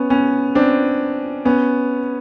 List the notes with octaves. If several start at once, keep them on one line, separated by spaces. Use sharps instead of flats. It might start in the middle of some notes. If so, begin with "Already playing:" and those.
Already playing: B3 C#4
B3 C#4
C4 D4
B3 C#4